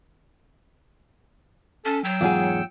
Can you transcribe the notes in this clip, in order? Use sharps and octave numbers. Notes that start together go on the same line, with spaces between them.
C#4 A4 A5
F#3 G5 E6
E2 G#2 F4 G#4 C#5 F#5